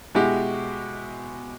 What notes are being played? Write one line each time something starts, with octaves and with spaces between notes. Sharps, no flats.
B2 G#3 E4 F#4 G4